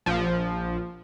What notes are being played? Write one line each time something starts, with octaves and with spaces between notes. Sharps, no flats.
A#1 F3